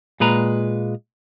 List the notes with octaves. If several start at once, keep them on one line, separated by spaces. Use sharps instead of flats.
A#2 G#3 B4 A#5